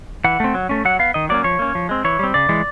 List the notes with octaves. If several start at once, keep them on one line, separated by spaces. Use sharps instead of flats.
E3 F#5
A3 C4
F#3
A3 C#4
F#3 F#5
B3 F5
D#3 D#5
F#3 A#3 C#4 D5
F3 C#5
A#3 C#4
F3
G#3 C4
E3 C#5
G3 C4
C#3 D5
E3 G#3